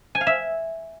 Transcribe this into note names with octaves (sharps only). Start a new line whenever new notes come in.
G#5
F5
E5